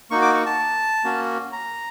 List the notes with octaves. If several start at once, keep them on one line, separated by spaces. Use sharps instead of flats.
A#3 D#4 F#4 C#6
D6
C#6
A5
A#3 C#4 F#4
A#5